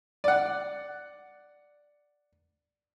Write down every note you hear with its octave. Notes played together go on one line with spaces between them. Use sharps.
D5 F#5